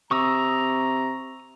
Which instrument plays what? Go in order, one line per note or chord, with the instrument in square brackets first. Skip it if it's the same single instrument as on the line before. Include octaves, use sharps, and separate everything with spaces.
[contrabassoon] C3 [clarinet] A#5 [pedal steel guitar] C#6 D#6 E6